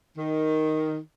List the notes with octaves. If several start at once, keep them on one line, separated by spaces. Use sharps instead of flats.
D#3